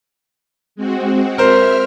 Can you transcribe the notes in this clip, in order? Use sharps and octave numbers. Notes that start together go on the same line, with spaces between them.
G#3 C4 F#4
A#4 C5 E5 F6